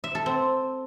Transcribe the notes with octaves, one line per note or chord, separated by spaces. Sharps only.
E5
A4
C4